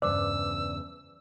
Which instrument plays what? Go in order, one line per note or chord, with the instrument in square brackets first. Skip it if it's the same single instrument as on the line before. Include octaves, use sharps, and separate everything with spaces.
[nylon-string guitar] E2 G2 C#3 [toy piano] C5 D6 [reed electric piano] D5 [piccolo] E6